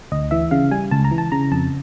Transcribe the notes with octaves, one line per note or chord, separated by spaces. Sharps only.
D2 D#5
E3 E5
C#3 F5
G3 G#5
C#2 A5
A#5
E3
A5
C#3 A#5
F2 A5